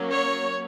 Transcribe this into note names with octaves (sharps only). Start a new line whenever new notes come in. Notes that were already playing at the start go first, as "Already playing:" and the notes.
Already playing: F#3 A#3 C#4
C#5